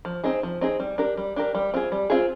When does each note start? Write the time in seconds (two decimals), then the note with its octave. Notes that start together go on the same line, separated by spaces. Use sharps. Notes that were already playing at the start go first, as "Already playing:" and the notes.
0.05 F3
0.24 C4 D#4 G#4
0.43 F3
0.61 C4 D#4 G#4
0.80 G3
0.98 D4 G4 A#4
1.17 G3
1.36 D4 G4 A#4
1.55 G3
1.74 C4 F4 G#4
1.92 G3
2.10 C4 F4 G#4